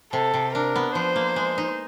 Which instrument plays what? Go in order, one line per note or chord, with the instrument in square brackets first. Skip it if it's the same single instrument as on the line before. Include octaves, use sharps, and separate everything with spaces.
[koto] C3 [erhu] A4
[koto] C3
[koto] D4 [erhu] A#4
[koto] B3
[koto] F3 [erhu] C5
[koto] A#3
G#3
D#4